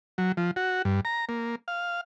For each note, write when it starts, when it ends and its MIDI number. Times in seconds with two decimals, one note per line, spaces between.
0.18 0.32 54
0.37 0.51 53
0.56 0.82 66
0.85 1.00 43
1.05 1.25 82
1.29 1.55 58
1.68 2.01 77